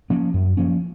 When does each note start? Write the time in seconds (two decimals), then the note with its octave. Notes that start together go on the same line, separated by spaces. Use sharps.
0.10 F3 A#3 C#4
0.34 F#2
0.57 F3 A#3 C#4